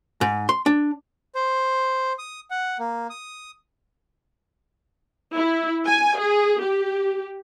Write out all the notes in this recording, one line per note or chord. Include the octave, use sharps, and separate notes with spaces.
G#2
C6
D4
C5
D#6
F#5
A#3
D#6
E4
G#5
G#4
G4